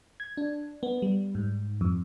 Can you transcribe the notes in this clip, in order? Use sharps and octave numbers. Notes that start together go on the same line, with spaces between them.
G#6
D4
B3
G3
G#2
F2